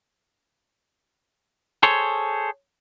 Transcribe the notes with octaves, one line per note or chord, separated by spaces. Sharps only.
G#4 A4 C5 C#5